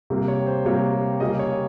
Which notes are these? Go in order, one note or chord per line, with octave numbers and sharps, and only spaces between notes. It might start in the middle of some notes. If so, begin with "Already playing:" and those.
C3 G3 A#3
C#5
C5
C3 G3 A#3 C#5
C#3 G3 A#3 D#5
C#5